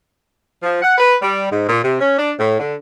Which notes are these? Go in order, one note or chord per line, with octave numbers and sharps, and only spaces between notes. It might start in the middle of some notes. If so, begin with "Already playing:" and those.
F3
F#5
B4
G3
G#2
A#2
C3
C#4
D4
A2
D3